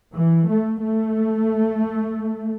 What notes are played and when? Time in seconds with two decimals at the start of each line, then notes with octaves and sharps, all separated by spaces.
0.14 E3
0.48 A3
0.82 A3